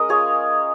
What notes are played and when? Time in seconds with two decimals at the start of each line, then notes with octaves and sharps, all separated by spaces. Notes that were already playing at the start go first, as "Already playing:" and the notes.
Already playing: G#3 C#4 A#4 D#5
0.09 F4 G#4 C#5